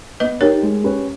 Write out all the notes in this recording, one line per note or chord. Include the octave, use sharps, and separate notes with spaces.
B3 B4 D#5
D#4 G4 A#4 C#5
G#3
C#4 G4 B4